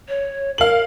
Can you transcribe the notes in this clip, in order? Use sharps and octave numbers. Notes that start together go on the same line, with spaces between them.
C#5
A#4 F5 F#7